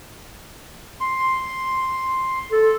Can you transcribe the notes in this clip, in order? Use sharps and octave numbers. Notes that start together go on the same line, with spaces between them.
C6
A4